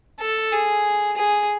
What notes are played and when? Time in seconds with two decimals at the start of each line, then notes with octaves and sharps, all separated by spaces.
0.20 A4
0.52 G#4
1.17 G#4